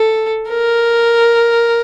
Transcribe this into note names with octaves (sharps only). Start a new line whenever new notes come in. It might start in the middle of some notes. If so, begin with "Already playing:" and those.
Already playing: A4
A#4